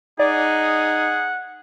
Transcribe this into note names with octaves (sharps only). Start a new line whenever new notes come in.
D#4 G#4 D5 F#5